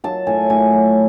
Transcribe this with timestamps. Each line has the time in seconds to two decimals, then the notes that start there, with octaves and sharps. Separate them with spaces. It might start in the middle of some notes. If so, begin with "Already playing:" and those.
0.04 F#3 A5
0.27 A2 G#5
0.50 A2 G#5
0.73 F#3